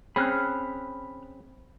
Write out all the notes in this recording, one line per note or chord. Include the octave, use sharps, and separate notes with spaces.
C4 C#4 G#4 B5 F6 F#6